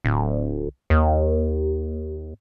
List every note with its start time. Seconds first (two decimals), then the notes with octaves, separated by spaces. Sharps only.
0.05 D1
0.90 D#2